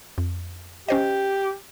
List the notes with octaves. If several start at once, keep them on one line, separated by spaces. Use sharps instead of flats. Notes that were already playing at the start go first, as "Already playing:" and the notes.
F2
C#4 G4 C5 D#5